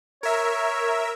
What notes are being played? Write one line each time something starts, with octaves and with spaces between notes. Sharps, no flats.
A#4 C#5 E5